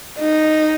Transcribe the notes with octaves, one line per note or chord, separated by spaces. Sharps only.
D#4